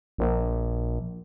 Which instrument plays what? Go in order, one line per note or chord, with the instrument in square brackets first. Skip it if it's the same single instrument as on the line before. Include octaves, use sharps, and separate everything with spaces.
[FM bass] A#1